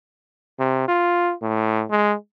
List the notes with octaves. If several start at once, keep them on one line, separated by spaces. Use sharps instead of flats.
C3
F4
A2
G#3